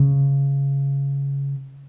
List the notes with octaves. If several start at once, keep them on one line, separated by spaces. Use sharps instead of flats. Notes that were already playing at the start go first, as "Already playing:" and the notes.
Already playing: C#3